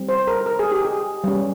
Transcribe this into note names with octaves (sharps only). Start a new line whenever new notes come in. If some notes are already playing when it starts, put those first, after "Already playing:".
Already playing: G3 C4
C5
A#4
A#4
G#4
G4
G#4
G3 C#4